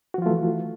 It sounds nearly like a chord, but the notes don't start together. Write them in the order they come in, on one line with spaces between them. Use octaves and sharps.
F#4 F3 F4 A3 E3